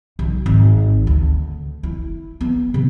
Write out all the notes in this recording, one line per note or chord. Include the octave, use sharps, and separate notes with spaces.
B1
G#1
D2
E4
B3
C3